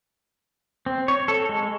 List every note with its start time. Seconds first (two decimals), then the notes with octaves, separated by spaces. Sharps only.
0.86 C4
1.08 C#5
1.28 A4
1.49 G#3